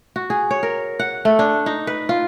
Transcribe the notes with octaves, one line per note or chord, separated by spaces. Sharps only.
F#4
G#4
C#5
A#4
F#5
A3
D4
D#4
B4
F4